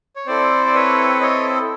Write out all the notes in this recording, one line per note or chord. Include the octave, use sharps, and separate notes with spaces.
C#5
C4 E4 A4 C5 D5
D5
B4 C#5
C#5 D#5